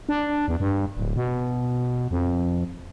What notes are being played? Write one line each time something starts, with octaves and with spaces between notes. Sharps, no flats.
D4
E2
G2
D1
B2
F2